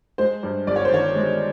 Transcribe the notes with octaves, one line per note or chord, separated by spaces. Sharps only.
G#3 C5
G2
G1 D5
C#5
C5
D#3 C#5
G#3